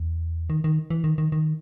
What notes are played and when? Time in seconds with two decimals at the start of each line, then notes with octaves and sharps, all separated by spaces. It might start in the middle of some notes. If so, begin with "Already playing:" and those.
Already playing: E2
0.50 D#3
0.64 D#3
0.90 E3
1.04 D#3
1.18 D#3
1.32 D#3